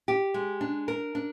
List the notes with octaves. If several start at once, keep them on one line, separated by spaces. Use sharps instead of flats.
G4
G#3
D4
A#4
D4